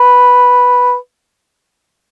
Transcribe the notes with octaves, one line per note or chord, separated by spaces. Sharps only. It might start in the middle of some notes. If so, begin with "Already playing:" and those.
Already playing: B4